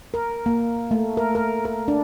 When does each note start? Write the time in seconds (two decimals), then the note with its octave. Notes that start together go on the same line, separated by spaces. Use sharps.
0.14 A#4
0.46 A#3
0.91 A3
1.17 A#4
1.35 A#4
1.65 A#4
1.88 D4